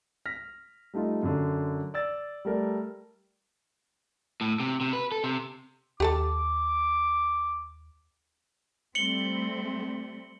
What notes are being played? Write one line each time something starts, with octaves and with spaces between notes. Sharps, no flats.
F6 A#6 B6
G3 A3 D#4 F4
F#2 D3
D5 E6 A6
G3 A3 A#4 D5
A2
C3
C3
B4
A4
C3
D#2 G4 A4 A5 D6
G3 A3 C4 C#7 F#7 G7